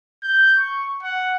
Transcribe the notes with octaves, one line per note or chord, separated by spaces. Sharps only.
G6
C#6
F#5